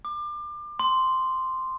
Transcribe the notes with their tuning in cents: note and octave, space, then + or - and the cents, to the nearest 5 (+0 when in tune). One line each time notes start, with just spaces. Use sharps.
D6 +30
C6 -5